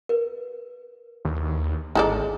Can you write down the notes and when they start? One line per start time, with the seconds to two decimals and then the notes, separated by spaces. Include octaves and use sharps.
0.09 A#4 B4
1.25 D#2
1.95 G#1 D#4 E4 G#4 A4 D5